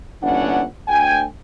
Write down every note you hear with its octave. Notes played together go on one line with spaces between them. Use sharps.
G1 A#2 E3 C#4 D4 F#5
D2 G5 G#5